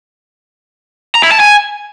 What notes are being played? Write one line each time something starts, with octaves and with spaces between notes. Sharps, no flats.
A#5
E4
A5
G#5